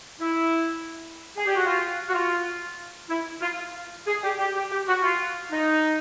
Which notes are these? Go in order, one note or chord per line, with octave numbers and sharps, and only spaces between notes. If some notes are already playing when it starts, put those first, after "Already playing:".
E4
G#4
G4
F#4
F4
F#4
F4
E4
F4
G#4
G4
G4
G4
G4
F#4
F4
D#4